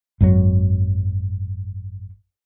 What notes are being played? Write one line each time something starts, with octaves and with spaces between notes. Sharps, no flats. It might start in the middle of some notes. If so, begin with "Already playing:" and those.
G#1 F#2 A#2 F#3